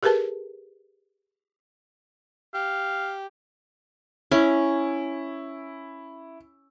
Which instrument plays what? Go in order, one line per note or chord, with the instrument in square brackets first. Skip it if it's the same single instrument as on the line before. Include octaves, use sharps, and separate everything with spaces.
[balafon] G4 G#4 A#4 B4 A5
[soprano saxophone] G4 [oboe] F5
[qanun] C#4 [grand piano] E4